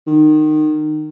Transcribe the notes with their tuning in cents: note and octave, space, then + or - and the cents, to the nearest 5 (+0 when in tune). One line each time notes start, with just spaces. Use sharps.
D#3 -20